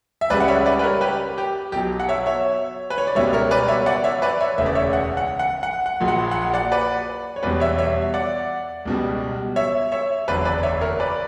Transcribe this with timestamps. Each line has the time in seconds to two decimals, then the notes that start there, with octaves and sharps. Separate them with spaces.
0.21 E5
0.30 C#2 C#3 G3 B4 D5
0.40 F#5
0.48 C#5 E5
0.66 B4 D5
0.79 B4
0.83 A#4 C#5
1.01 G4 B4
1.38 G4
1.72 B1 B2 F#3 G4
2.00 F#5
2.09 C#5 E5
2.26 C#5 E5
2.90 B4
2.98 C#5
3.07 D5
3.15 C#2 B2 G3 C#5 E5
3.33 A#4 C#5
3.51 B4 D5
3.63 D5
3.68 C#5 E5
3.86 D5 F#5
4.04 C#5 E5
4.22 B4 D5
4.41 C#5 E5
4.58 E1 D2 C#3 E3 E5
4.66 D5
4.75 C#5 E5
4.93 F#5
5.17 F#5
5.39 F#5
5.63 F#5
5.86 F#5
6.00 A#1 A#2 F#3
6.08 F#5
6.31 F#5
6.54 D5 F#5
6.72 B4 D5
7.36 C#5
7.43 E2 B2 G3 B4 D5
7.60 C#5 E5
7.78 C#5 E5
8.14 D5 F#5
8.85 C#2 B2 G3
9.56 C#5 E5
9.92 C#5 E5
10.28 F#1 E2 D3 F#3 B4 D5
10.45 B4 D5
10.63 C#5 E5
10.81 A#4 C#5
11.00 B4 D5